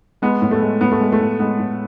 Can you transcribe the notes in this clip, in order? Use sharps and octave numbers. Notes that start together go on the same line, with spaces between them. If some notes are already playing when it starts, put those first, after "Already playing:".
G#3 B3
A2
A3
G#3
A2 B3
A3
G#3
A3
A2
G#3 B3
A2